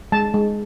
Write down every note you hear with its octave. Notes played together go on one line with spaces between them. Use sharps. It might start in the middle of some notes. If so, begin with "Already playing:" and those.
G#3 A5
G#3